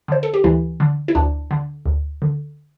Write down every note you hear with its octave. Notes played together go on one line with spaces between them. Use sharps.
D3 C5
A4
G4
D2 E3 E4
D3
E4
D2 D4
D3
D2
D3